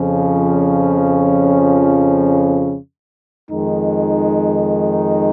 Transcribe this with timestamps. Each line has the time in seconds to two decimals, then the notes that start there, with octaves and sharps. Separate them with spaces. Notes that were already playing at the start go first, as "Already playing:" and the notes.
Already playing: F2 C#3 F3 C#4
3.51 F2 D#3 G#3 D#4